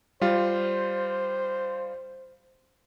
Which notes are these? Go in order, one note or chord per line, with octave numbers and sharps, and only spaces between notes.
G3 F4 C5